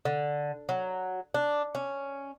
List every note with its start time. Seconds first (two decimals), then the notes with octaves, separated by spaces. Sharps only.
0.05 D3
0.69 F#3
1.34 D4
1.75 C#4